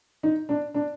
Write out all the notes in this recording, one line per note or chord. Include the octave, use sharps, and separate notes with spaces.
D#4
D4
D4